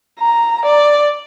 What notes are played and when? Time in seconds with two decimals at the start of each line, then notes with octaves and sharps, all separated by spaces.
0.20 A#5
0.66 D5